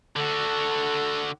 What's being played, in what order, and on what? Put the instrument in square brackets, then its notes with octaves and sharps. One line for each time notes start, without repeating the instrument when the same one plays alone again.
[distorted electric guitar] D3 F#4 [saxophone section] A4